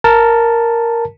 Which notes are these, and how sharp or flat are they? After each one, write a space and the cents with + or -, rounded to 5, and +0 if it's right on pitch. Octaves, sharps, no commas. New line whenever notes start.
A#4 +0 A5 +0